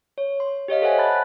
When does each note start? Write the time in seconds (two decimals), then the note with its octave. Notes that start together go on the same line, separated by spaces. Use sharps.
0.18 C#5
0.40 C6
0.68 G4 C#5 D#5 F5
0.82 A4 C5 E5 F#5 G#5
0.98 A5 B5 F#6 A6